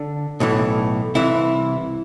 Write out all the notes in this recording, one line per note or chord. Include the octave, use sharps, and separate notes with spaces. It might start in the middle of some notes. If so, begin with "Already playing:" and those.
Already playing: D3 D4
B1 A2 E3
C2 C3 E3 E4